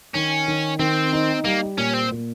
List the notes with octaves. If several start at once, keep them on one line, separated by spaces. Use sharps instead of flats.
D#3 C#4
D#3
D#3 C4
D#4
G3 A#3
A#2 C#4
C4
A#2